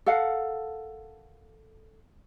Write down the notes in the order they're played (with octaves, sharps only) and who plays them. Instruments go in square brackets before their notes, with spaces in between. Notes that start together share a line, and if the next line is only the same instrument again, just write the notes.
[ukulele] A4 A#4 F5 F#5